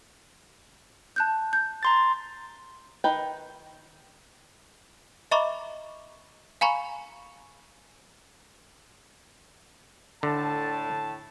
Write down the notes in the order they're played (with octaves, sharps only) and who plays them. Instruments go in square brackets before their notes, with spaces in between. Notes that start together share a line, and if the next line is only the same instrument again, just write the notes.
[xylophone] A5 F#6 G6
G6
[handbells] A#5 C6 A6
[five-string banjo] D#3 D#4 B4 G5
[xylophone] D#5 E5 A#5 B5 C#6 D6
F5 G#5 A#5 B5 C#6
[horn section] A2 A5 [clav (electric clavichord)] D3